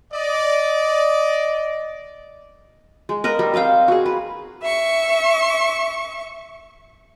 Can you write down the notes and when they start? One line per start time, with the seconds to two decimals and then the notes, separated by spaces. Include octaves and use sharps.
0.12 D5 D#5
3.09 G#3
3.24 A#4 B4 D#5 A#5
3.39 G3
3.54 G3 C4 F5 G5
3.88 F#4 G#4
4.06 B4
4.62 E5 C#6